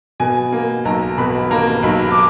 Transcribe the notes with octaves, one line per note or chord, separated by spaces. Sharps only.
B2 G#5
A#3
B1 A#5
B2 B5
A#3 A#5
B1 B5
D6